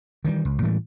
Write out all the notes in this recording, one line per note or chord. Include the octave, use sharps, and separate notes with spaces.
D#3 E3 F#3 G3
C#2
A2 E3 G3 G#3